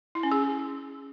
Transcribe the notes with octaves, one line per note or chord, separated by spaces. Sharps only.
E4
C#4
G#4